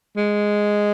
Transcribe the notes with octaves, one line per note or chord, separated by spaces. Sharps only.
G#3